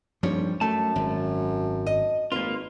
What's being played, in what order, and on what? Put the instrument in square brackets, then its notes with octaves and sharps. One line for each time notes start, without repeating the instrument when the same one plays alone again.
[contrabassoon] D#1 [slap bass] G2 F3 G3 [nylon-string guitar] C#5
[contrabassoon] F#2 [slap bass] A3 [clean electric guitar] A5
[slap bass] G#1
[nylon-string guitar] D#5
[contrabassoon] G#1 [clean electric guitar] A#3 F4 [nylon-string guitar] B4